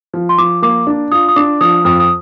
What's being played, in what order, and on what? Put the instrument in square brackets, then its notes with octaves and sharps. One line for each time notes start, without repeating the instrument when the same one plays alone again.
[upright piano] F3
[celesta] C6
[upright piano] F3 [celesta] D6
[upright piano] A#3 [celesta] D6
[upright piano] D4
[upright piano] F4 [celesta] D#6
[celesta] D#6
[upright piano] D4 [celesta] D6
[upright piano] F3 [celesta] D#6
[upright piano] F2 [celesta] D#6
[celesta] D#6